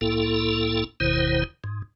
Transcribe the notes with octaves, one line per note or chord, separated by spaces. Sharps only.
C2 A2 A#3 E4 A4
F#1 D#2 B2 D#3 E4 C5
G#2